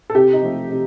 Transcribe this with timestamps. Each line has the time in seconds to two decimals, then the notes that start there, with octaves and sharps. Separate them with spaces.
0.10 A4
0.15 C3 G4
0.33 D#4
0.43 F3 A3
0.70 C3